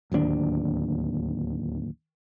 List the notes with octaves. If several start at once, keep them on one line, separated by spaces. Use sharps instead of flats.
D1 D#2 D#3 D4